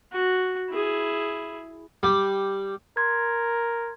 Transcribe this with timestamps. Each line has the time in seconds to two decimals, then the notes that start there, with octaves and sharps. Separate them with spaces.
0.13 F#4
0.70 E4 G#4
2.03 G3 G4
2.97 A#4 C6 G#6